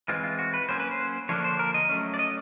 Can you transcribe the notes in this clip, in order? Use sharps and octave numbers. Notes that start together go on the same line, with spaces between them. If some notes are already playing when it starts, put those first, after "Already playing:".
E3 G#3 C4 F4
F4
F#4
B4
F#3 A#3 C#4 C5
B4
C5
D3 F3 A#3 D4 C#5
C5
A#4
D#5
F#3 A3 C#4
D5
D#5